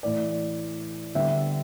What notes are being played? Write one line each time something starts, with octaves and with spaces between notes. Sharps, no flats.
A2 E3 A3 D5
D3 G3 B3 E5